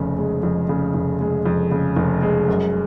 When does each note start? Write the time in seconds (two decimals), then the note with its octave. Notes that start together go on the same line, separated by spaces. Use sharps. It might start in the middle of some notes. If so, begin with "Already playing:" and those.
Already playing: F1 F2 C#3
0.18 G#3
0.43 F2
0.69 C#3
0.94 F1
1.21 G#3
1.46 F2
1.71 C#3
1.96 F1
2.22 G#3
2.48 F#2